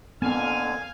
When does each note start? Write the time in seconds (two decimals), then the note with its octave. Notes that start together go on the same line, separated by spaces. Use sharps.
0.22 F2 A#2 D3 B3 C4 F5 G#5